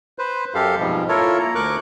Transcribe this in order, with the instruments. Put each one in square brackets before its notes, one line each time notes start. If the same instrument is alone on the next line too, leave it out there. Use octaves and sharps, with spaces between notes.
[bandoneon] B4 C5
F#2 G4 A4 F5
F2 G#2 B2 F3 G3
E4 F4 A4 A#4 C#5
A#3 A#5
D2 A#4 C#6 D6 F#6